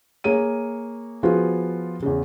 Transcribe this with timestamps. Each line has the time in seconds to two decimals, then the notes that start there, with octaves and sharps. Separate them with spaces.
0.24 A#3 G#4 C#5 D#7
1.23 F3 B3 F4 F#4 G#4
2.02 E2 C#3